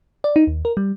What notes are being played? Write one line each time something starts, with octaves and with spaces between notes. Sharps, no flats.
D5
D#4
D#2
A#4
G3